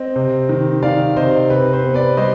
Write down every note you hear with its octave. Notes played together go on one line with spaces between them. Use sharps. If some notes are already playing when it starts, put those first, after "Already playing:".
Already playing: C4 D#5
C3
D#3
D#3 D5 F5
C3 C5 D#5
C3 B4
C5
B3
B4 D5
G3 C5 D#5